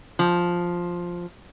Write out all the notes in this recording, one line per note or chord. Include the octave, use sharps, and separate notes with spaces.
F3